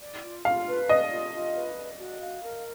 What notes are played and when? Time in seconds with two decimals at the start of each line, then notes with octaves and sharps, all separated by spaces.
0.01 D5
0.23 F4
0.45 F4 F5
0.67 B4
0.89 D5 D#5
1.11 F4
1.33 F4
1.55 B4
1.77 D5
1.99 F#4
2.20 F5
2.43 A#4